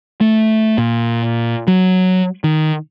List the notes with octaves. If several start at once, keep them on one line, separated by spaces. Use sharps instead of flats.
A3
A#2
F#3
D#3